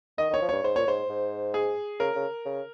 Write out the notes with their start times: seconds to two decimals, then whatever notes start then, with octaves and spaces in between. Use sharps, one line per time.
0.18 D#3 D#5
0.30 D#3
0.34 C#5
0.42 F3
0.49 G2 C#5
0.63 G#2 C5
0.76 A#2 C#5
0.87 G#2 C5
1.09 G#2
1.54 G#4
2.00 C#3 A#4
2.15 C#3
2.45 C#3